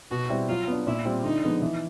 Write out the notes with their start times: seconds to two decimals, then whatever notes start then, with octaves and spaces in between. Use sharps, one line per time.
0.11 B2 F#4
0.30 G3 C4 E4
0.49 F#3 F4
0.67 B3 D4
0.87 A#2 E4
1.05 G3 C4 F4
1.24 D3 D#4
1.43 F3 G#3 B3
1.62 E3